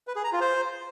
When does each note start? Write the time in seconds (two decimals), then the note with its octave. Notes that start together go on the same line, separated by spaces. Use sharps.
0.07 B4
0.16 G#4
0.24 A#5
0.32 F4
0.41 C5